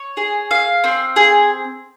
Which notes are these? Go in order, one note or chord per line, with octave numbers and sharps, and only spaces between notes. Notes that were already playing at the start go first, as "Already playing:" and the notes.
Already playing: C#5
G#4
F5
C4
G#4